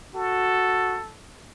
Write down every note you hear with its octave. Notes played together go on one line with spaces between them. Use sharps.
F#4 A4